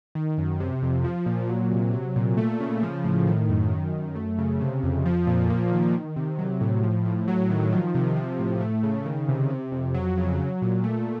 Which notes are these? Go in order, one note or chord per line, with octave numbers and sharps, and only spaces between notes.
D#3
F#2
C3
F2
F3
A#2
F#3
C3
F#3
A#2
A3
C#3
F3
A2
D#3
F#2
D#3
F#2
A3
C#3
C3
F2
F3
A#2
A#3
D#3
D#3
C3
F#3
A2
F3
A2
F#3
D#3
F3
C3
F3
A2
A3
C#3
D#3
C3
C3
F2
F#3
C#3
F#3
A#2
A3